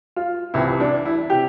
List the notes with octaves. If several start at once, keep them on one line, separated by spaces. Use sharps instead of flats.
F4
C2 C3 E3 E4
D4
E4
C3 G4